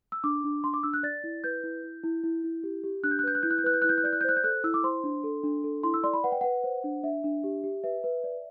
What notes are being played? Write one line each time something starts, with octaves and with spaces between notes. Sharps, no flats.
E6
D4 D6
D4
D4 C6
D6
D4 E6
F#6
D5 A6
E4
B4 G6
E4
E4
E4
E4
E4
G4
G4
D4 F#6
G6
F#6
B4 G6
F#6
E4 G6
F#6
G6
B4 F#6
G6
E4 F#6
G6
F#6
D5 G6
F#6
G6
C5 F#6
G6
A4 F#6
E4 E6
D6
C5 C6
D4
A4
D4
A4
E4 C6
E6
D5 C6
B5
B4 F#5
G5
B4 F#5
C5
D4
D4 E5
D4
G4
G4
B4 E5
B4
D5